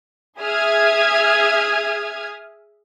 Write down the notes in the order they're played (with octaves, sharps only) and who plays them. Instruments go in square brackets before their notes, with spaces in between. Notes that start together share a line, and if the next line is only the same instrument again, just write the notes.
[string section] G#4 E5 D#6 F6 G#6